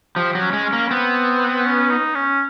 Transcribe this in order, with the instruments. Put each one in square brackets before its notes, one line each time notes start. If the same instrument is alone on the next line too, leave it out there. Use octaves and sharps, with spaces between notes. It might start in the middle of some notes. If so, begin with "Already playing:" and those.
[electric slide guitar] F3 [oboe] G4
[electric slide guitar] F#3
[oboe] C#4
[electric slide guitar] G#3
[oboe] C#4
[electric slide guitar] A#3
[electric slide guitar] B3 [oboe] C4
[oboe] C#4
D#4
C#4